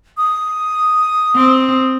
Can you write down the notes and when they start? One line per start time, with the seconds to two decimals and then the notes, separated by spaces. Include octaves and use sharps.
0.17 D#6
1.35 C4